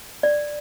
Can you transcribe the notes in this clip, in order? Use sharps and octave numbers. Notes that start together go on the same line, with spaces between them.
D5